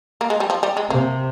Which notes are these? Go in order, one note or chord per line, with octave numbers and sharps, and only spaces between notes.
A#3
G#3
G3
F3
G3
G#3
C3 A#3